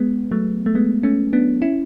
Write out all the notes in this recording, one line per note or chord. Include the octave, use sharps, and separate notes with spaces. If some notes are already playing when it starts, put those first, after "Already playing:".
Already playing: G#3 B3
F#3 A3
A3
G#3 B3
A3 C#4
B3 D4
C#4 E4